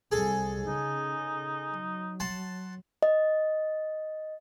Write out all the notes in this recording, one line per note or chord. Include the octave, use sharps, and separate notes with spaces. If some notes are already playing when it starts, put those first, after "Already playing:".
C2 G#4 A4
C#3 D#4
F#3
F#5 A5 C6
D#5